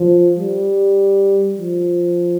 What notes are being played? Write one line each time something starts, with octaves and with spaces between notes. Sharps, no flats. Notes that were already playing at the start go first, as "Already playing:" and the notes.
Already playing: F3
G3
F3